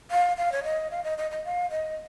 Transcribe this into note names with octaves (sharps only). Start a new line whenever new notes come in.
F5
F5
C#5
D#5
F5
D#5
D#5
D#5
F5
D#5